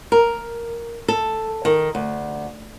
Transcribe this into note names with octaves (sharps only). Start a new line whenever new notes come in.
A#4
A4
D#3
D2